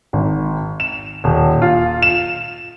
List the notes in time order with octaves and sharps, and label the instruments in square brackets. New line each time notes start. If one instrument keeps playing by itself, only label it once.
[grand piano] G#1
E7
D#1
F4
E7